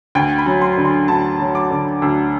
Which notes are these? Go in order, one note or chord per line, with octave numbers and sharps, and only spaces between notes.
D2 G5
B5
F#3
C6
D3
C6
D2 A5
F#3
D6
D3
D2 E6